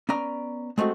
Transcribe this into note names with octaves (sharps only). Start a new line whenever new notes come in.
B3 C#4 D5 A#5
G#3 A3 C4 F#4